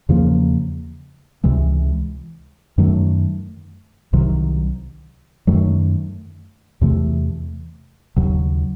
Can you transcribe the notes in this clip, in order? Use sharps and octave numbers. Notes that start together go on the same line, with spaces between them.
E2 C#3 F3 A#3
C#2 C3 E3 G#3
F#2 D#3 F#3 A3
C2 C3 D#3 F#3
F#2 D#3 F#3 A3
E2 C3 E3 A3
D#2 C#3 F#3